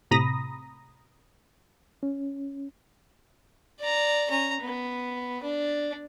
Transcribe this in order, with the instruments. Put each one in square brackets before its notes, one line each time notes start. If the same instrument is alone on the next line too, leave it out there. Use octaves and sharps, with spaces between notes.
[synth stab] A2 C3 A#5 B5 D#6 A#6
[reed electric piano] C#4
[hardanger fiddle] D5 A#5
C#4 A#5
B3
D4